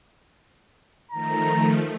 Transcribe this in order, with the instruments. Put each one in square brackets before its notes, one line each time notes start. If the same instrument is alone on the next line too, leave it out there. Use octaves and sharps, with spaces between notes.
[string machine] D#3 F3 A3 [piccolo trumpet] A#5